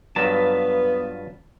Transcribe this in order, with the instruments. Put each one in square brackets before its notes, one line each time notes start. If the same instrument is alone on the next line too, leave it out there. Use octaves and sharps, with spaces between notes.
[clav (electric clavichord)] G2 F#3 A#5 [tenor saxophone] B3 [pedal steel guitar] F4 B4 A5